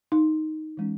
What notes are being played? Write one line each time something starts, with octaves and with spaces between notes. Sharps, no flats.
D#4
E3 G#3 C#4